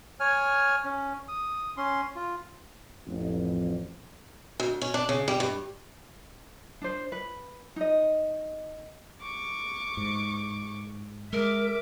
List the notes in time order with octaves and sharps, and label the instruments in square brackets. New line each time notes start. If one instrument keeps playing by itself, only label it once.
[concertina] C#5 G#5 F6
C#4
D#6
C#4 C6
F4
[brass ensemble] A1 F2
[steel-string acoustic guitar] D2
C#4
D4
C#3
G3
G2
[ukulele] D4 C5
B4
D#4 D#5
[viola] C#6 D6
[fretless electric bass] G#2
[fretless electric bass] G#3 [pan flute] A#4 [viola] E5 D6